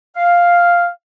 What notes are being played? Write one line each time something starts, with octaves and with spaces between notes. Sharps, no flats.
F5